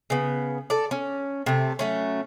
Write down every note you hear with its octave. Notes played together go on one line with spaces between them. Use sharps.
C#3 B3
A4 D5
C#4
C3 A3
F#3 A3 C#4